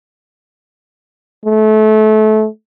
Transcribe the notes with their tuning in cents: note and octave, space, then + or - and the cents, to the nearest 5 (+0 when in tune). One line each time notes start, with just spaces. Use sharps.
A3 -25